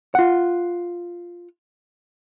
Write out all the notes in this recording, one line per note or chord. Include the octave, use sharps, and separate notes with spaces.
F4 F#5